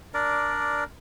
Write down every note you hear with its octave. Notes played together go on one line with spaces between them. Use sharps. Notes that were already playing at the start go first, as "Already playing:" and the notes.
D4 A#4 D5